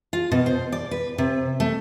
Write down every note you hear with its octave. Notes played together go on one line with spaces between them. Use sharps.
F4
B2
C5
D5
B4
C3
A3